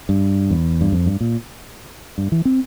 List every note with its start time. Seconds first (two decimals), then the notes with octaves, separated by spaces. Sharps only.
0.09 G2
0.50 E2
0.81 G2
0.92 F2
1.06 G2
1.21 A#2
2.18 G2
2.32 E3
2.45 C4